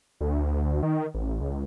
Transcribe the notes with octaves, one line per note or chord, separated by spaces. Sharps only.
D2
D#3
A1
C#2